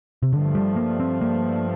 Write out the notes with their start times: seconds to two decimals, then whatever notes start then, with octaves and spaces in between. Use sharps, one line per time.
0.23 C3
0.32 G2 D3 F3 A3
0.55 G3
0.76 A#3
1.00 C4
1.22 A#3